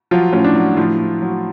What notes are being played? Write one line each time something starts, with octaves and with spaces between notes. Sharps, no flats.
F3 F#3 F4
A2 C#4
D4
F#3
A2 F3 F4
A2
F#3